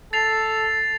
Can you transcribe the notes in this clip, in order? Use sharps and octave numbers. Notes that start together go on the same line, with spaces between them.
A4 A6 C7 F7